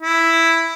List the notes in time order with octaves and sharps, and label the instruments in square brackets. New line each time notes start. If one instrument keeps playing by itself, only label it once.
[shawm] E4